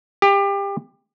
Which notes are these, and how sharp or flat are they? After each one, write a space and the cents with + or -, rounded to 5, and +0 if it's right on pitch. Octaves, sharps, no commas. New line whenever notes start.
G4 +25